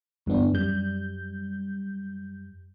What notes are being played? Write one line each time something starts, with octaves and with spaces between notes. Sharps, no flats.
D2 G2 E3 B3 D4
F#2 G3 G6